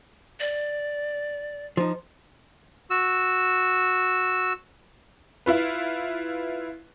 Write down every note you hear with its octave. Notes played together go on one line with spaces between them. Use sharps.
D5
F3 D#4
F#4 E6
E4 F4 B4